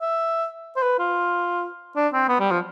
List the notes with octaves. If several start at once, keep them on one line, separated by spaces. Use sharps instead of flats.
E5
C5
B4
F4
D4
C4
B3
G3
F3